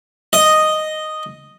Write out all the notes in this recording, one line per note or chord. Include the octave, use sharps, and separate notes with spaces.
D#5